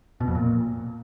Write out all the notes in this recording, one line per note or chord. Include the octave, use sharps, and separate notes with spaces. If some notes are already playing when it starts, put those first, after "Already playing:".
B2
F2
A#2